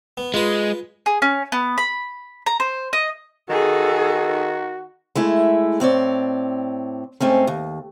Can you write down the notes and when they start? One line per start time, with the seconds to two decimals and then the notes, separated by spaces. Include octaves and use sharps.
0.17 B3
0.34 G#3 F4 B4
1.06 G#4
1.22 C#4
1.52 B3
1.78 B5
2.46 A#5
2.60 C5
2.93 D#5
3.49 D#3 F#4 G#4 A4
5.15 G#3 A3 E4
5.80 A2 C4 C#5 D5
7.20 G#2 A3 C4 C#4
7.47 D#2